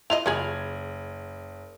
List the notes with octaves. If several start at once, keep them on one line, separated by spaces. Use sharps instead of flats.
E4 F4 D#5 F7
F#1 F4 G#4 B5 G#6